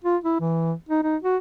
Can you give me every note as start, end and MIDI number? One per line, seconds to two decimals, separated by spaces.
0.04 0.17 65
0.24 0.36 64
0.40 0.73 52
0.89 1.03 63
1.03 1.17 63
1.23 1.37 66